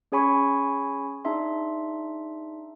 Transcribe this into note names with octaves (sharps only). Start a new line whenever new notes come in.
C#4 G#4 C#5 G#5 B5 C#6
D4 D#4 G#4 E5 C6